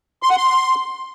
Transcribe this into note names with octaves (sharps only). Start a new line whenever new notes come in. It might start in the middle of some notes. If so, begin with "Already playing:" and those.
C6
F#5
C6